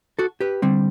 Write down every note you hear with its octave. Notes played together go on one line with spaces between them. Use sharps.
F#4 A4
G4 B4
D3 G3 C4